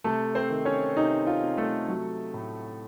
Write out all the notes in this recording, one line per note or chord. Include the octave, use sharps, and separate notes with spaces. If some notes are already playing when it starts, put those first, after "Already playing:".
C3 A3 A4
C4 C5
D#3
C#4 C#5
C3 D#4
F4
C3
A3 A4
F#3
A2